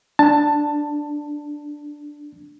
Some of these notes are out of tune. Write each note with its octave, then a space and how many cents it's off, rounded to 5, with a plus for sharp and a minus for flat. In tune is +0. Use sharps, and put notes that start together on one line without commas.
D4 +0 A5 +10